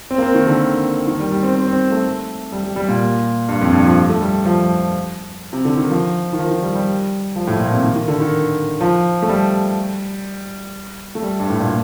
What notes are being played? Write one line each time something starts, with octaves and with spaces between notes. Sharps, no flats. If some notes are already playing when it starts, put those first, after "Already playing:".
C4
A#3
C4
D#3
D3
D#3
G3
G3
C4
C4
C4
A3
G3
G3
G3
A#2
G2
F2
G2
F3
A3
G3
F3
C3
D3
D#3
F3
D#3
F3
D#3
G3
G3
F3
A2
A#2
C3
D#3
D#3
D3
D#3
F3
A3
G3
A3
G3
G2
A2
A#2